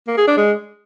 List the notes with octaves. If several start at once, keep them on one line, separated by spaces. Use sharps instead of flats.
A#3
G#4
D4
G#3